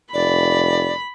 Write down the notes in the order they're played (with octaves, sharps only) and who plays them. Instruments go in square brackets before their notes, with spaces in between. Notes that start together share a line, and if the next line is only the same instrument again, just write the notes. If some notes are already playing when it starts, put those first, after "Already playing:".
[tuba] F1 [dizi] D5 [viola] B5